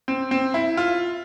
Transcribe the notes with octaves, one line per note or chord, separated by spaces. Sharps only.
C4
C4
E4
F4